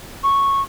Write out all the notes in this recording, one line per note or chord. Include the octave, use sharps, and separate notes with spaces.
C#6